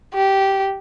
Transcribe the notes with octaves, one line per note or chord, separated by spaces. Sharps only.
G4